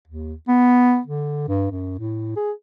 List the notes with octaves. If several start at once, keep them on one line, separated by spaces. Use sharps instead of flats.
D#2
B3
D3
G2
F#2
A2
G#4